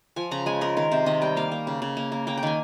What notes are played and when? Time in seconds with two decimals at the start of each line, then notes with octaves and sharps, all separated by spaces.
0.16 F3 G#5
0.31 C#3 A#5
0.46 G#3 G#5
0.61 G#3 A#4
0.77 D#3 A#4
0.91 C3 C5
1.06 D#3 D#5
1.22 G3 G5
1.37 A#3 F5
1.51 A#3
1.67 C#3
1.82 C#3
1.97 A#3
2.12 A#3
2.27 A#3 G5
2.37 G5
2.43 D#3 G#5